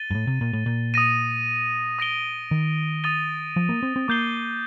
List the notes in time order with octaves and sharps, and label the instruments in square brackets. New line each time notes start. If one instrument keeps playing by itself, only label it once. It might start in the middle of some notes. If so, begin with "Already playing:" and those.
Already playing: [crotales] A6 D#7 G7
[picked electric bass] G2
A2
C3
A#2
A2
A#2
[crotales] D#6 A#6 D#7
D#6 A#6 D7 G7
[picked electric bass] D#3
[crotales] D#6 A6 D#7 G7
[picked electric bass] F3
A#3
C4
C4
[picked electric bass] A#3 [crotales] D6 G6 C7 G7